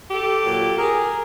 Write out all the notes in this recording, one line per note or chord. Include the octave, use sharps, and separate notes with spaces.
G4 A4
A#2 F#3
G#4 A#4